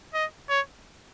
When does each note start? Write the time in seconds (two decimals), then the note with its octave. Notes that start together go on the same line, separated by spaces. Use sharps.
0.14 D#5
0.50 C#5